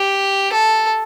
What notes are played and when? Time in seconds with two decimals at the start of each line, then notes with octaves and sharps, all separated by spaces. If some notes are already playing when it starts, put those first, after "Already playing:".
Already playing: G4
0.53 A4